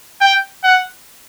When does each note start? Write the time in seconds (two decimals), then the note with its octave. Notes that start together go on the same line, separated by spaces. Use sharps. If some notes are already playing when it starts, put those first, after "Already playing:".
0.21 G5
0.64 F#5